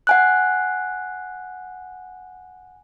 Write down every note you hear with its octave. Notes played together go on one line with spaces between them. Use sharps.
F#5 G#5 F#6